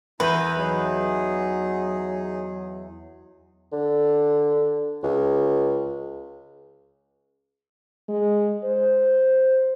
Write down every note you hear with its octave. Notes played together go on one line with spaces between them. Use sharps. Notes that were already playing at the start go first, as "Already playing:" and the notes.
E2 E4 B4 A#5 G6
F#3 D#4 G#4
D3
C#2
G#3
C5